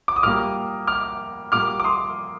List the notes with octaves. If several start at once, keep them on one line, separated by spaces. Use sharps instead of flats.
D6
D#6
A#2 G3 A#3 D6 F6
D6 F6
A#2 G3 A#3 D6 F6
D6
C6 D#6